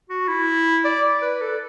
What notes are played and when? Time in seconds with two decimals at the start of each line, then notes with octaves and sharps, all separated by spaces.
0.09 F#4
0.28 E4
0.84 D5
1.22 B4
1.41 A4